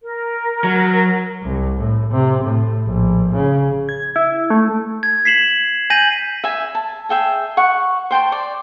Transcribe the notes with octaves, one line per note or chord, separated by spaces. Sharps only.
A#4
F#3
C2
A2
C3
A2
A#1
C#3
G#6
E4
A3
G#6
B6 C7 E7 F#7
G#5 G6 A#6 D#7 F#7
E5 G#5
A5
G#4 E5 G5 A5
F#5 C#6
C5 G5 A5 C6
D5